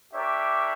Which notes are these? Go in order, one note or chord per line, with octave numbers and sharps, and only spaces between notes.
D4 G4 A#4 C#5 E5